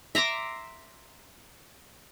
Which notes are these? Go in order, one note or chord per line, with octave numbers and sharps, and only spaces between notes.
E5 A#5 C6 D6